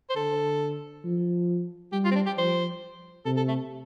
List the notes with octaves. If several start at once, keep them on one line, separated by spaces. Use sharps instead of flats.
C5
D3 A4
F3
G3 G4
F4
C4
D4
G4
F3 C5
C3 A4
A4
A3